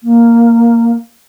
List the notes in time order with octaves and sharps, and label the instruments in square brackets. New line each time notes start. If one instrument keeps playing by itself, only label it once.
[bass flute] A#3